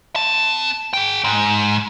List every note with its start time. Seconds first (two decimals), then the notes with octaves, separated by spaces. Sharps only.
0.16 C4 A5
0.93 G#4 G5
1.24 G#2